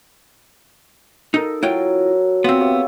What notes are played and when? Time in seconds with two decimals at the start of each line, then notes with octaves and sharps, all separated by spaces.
1.34 D#4 A4 A#4
1.63 F#3 E4 F4 G5
2.44 B3 C4 F4 F#4
2.61 G4 C#5 E5